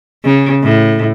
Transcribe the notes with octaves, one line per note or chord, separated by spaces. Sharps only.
C#3
A2